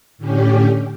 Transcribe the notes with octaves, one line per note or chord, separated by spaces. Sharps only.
A2 D3 C#4 G4